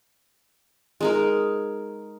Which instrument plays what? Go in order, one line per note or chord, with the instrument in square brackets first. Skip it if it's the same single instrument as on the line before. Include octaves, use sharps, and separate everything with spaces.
[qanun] G#3 D#4 A#4